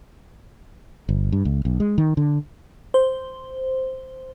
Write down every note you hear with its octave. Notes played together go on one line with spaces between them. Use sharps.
G1
G2
C#2
B1
G#3
D#3
D3
C5